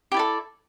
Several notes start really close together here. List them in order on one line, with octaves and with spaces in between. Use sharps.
G4 E4 D5 A4